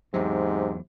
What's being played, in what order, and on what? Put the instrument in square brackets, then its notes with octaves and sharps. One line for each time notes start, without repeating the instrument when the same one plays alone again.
[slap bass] E2 F#3 [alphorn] G#2 [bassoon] C3